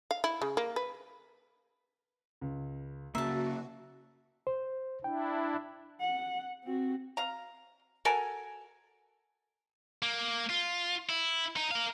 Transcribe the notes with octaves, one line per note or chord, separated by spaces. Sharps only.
F5
E4
C#3
A#3
B4
C#2
C#3 A#3 F#4 E5 A5 A#5
C5
D4 E4 G5
F#5
C4 F#4
F5 A#5
F#4 A4 A#4 G#5
A#3
F4
E4
D#4
A#4 F5